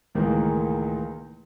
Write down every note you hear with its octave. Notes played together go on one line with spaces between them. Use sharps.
C#2 A2 D#3 E3 G#3 A#3